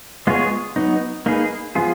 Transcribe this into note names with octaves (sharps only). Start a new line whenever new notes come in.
G#3 B3 F4 G#4 C#5
F#3 B3 D#4
A#3 D#4 G#4 B4
F3 B3 F4 G#4